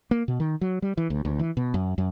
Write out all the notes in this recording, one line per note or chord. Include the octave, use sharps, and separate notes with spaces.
A#3
B2
D#3
F#3
G3
E3
D2
D2
E3
B2
F#2
F#2